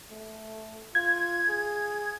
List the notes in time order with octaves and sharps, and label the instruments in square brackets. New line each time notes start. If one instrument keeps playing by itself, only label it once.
[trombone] A3
[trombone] F4 [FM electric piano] G#6
[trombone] G#4